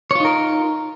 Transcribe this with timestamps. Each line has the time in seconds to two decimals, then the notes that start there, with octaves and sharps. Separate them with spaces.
0.11 C#5
0.15 F4
0.20 D#4
0.25 A#4